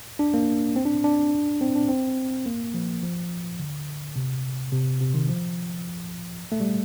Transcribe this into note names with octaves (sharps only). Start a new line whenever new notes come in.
D4
A#3
C4
D4
D4
C4
D4
C4
A#3
F3
F3
D3
C3
C3
C3
D#3
F3
A3
G3